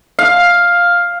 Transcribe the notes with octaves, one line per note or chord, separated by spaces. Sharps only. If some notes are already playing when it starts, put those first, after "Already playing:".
F5